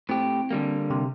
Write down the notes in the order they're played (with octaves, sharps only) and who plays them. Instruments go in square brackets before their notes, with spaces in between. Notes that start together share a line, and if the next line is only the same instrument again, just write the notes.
[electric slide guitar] A2 G4 [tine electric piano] C4
[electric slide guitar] D3 G3 A#3
[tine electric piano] C3